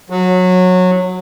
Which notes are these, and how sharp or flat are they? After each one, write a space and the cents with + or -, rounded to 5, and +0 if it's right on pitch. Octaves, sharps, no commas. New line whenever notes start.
F#3 -20